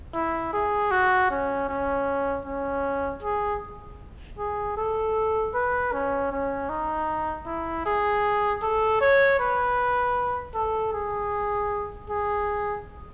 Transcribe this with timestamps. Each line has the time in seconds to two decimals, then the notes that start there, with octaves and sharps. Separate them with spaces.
0.14 E4
0.53 G#4
0.91 F#4
1.30 C#4
1.69 C#4
2.45 C#4
3.23 G#4
4.39 G#4
4.77 A4
5.54 B4
5.92 C#4
6.32 C#4
6.69 D#4
7.46 E4
7.86 G#4
8.62 A4
9.01 C#5
9.40 B4
10.54 A4
10.93 G#4
12.09 G#4